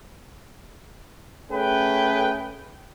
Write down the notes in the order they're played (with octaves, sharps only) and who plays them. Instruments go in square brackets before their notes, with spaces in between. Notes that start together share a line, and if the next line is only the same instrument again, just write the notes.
[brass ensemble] A3 C#4 G#4 B4 G5